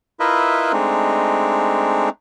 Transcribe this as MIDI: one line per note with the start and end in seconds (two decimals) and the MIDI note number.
0.20 0.72 64
0.20 0.72 65
0.20 0.72 70
0.20 0.72 71
0.20 0.72 75
0.20 0.72 76
0.72 2.09 56
0.72 2.09 57
0.72 2.09 60
0.72 2.09 62
0.72 2.09 63